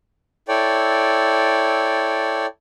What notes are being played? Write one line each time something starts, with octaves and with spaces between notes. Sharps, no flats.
E4 A4 C#5 D5 G5